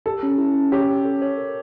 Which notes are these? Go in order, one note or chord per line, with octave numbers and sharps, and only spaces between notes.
G4 A4
C#4
E4
C#4
G4 C#5
C#4
A4
C#5
A#4